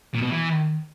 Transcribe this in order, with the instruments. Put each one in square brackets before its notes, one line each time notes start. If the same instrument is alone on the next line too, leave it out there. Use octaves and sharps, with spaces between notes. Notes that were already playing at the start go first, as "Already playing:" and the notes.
[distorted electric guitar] A#2
B2
E3